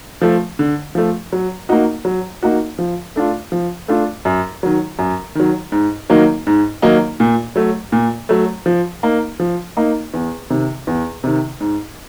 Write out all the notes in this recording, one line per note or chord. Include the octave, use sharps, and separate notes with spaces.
F3 A3
D3
F3 A3
F#3
A#3 D#4 F#4
F#3
A#3 D#4 F#4
F3
A3 D4 F4
F3
A3 D4 F4
F#2
D#3 F#3
F#2
D#3 F#3
G#2
D#3 F#3 A#3 D#4
G#2
D#3 F#3 A#3 D#4
A#2
F#3 A3
A#2
F#3 A3
F3
A#3 D#4
F3
A#3 D#4
E2
C3 D#3
E2
C3 D#3
G#2